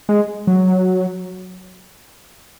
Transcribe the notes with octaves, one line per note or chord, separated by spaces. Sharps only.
G#3
F#3